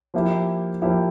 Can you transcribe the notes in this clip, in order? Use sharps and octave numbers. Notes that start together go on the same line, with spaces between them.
F3 A#3 E4 G4
F3 A#3 E4 G4